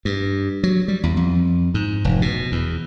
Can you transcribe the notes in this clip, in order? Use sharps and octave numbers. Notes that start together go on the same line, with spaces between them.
G2
F#3
G3
E2
F2
G#2
F1
B2
E2